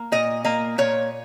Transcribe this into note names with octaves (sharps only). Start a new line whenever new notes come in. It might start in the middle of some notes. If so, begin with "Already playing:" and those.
Already playing: A#3
A#2 D#5
A#3 D#5
A#2 C#5